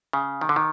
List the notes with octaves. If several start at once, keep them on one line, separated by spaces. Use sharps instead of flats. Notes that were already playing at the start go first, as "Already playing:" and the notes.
C#3
D#3
D3
D#3